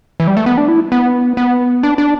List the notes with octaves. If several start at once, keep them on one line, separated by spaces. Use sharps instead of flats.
E3
G3
A3
B3
D4
E4
B3
B3
D4
D4